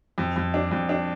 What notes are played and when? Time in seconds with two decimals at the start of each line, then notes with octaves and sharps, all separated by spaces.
0.18 F2
0.36 F2
0.54 D4
0.71 F2
0.89 D4